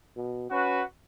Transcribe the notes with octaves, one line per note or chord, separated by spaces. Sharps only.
B2
C#4 F#4 B4